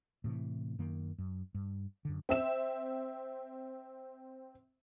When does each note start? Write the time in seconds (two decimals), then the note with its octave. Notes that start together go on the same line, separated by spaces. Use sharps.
0.24 A2 C3 E3
0.79 F#2 D#3 A#3
1.18 F#2
1.54 G2
2.05 F#2 D3
2.29 C4 E5 E7